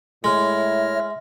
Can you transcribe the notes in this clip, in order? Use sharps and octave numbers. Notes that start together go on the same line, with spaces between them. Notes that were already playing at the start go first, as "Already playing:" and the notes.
A2 G#3 E4 C#5 E5 F6 A#6